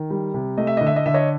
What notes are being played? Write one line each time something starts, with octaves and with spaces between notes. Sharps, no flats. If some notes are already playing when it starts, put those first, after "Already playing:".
Already playing: D#3
G3
C3
A3 D#5
E5
D3 D#5
E5
D#5
D3 E5
C#5 D#5